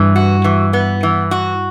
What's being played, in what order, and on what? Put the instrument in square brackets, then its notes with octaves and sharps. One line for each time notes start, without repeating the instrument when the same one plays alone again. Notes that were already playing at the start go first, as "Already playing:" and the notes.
Already playing: [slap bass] G2 [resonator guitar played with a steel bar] E3
[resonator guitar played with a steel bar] F#4
E3
B3
E3
F#4